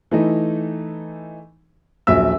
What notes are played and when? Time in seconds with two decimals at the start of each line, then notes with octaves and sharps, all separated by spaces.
0.11 E3 A3 D#4
2.07 D#1 A#1 F#3 E5 E6